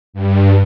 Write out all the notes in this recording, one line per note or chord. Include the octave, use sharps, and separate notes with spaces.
G2